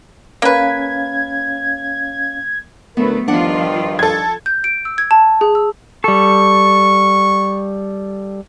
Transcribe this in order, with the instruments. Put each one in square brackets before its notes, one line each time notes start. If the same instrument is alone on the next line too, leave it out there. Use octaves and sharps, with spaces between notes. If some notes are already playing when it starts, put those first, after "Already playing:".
[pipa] A#3 B4 [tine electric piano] C#4 F5 [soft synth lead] G#6
[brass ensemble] D2 A#4 B4 [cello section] F#3 A3 [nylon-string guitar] B3
[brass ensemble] G2 D#3 [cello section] F3 F4 [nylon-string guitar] D4 F#5
[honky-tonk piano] A4 G#6
[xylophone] G6
D7
E6
G#6
A5
G#4
E6
[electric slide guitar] G3 A4 [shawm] C#6